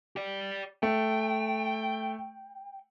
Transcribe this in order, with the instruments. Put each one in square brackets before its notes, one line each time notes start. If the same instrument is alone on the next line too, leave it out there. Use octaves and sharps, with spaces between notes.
[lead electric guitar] G4 D5
[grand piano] A3 [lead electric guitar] G5